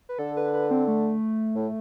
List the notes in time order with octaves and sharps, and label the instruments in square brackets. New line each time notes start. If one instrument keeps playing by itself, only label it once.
[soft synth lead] B4
[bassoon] D3 [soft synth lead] A4
[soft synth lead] B4
B4
C4
A3
[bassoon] A2